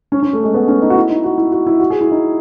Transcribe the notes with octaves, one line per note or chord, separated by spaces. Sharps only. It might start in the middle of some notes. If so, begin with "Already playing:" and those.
C#4
C#4
A3
G#3
B3
C#4
D#4
F#4
E4
D#4
F#4
E4
F#4
E4
F#4
G#4
E4
D#4